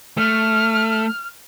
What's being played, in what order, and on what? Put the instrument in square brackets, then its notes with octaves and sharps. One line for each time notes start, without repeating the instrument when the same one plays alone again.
[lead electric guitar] A3 [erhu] F6